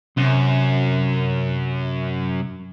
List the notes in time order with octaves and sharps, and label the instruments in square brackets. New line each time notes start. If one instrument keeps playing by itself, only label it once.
[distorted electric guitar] F#2 [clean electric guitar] C3